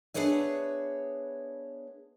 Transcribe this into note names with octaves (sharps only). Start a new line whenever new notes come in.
B3 D4 G#4 B4 C#5 E5